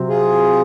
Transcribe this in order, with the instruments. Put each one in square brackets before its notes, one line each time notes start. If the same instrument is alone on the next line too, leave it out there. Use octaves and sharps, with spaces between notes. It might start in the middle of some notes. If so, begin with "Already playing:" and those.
Already playing: [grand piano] C3 F#3 C4
[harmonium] F4 G#4